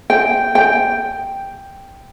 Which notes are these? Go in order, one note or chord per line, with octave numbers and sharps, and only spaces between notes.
G5
G5